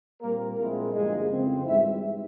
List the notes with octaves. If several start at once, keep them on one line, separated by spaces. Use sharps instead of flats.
A#2 G3 A#3 C4 A#4
A#1 A#2 G#3 A#3 C4 E4 A#4
G1 G2 F3 G#3 A#3 E4 G#4
F2 C#3 F3 C4
G#1 G#2 E3 G3 E4 E5